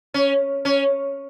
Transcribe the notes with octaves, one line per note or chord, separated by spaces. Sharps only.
C#4
C#4